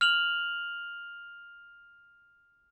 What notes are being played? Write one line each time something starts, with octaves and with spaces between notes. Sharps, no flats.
F6 F7 F#7